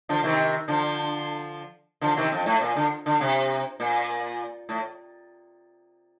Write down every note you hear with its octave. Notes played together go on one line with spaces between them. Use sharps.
D3 F3
C3 D#3
D3 F3
D3 F3
C3 D#3
F2
A2
A#2
D3
D3
C3
A#2
A2